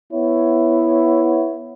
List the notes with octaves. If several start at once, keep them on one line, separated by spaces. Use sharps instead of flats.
B3 E4 C#5